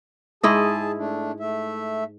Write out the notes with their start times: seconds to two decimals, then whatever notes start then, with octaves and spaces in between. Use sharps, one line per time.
0.43 G#2 E4 G#4 D#5 A5
0.98 A3 D4
1.40 A3 E5